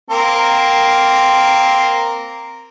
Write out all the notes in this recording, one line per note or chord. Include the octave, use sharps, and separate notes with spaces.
A#3 C4 A#4